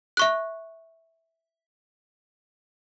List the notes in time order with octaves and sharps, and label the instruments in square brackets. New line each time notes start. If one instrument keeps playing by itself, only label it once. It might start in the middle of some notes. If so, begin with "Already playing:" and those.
[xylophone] E5 C#6 F#6